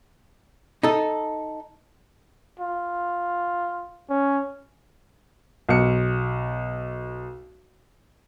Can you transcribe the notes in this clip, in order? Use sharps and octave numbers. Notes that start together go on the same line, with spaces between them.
D#4 A4
F4
C#4
B1 C#7